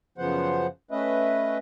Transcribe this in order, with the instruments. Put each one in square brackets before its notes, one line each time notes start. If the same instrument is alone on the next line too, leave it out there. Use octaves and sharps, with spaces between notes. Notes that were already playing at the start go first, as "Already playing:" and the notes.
[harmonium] F#2 C#3 F3 B3 C5 F#5
A3 C#4 B4 D#5 E5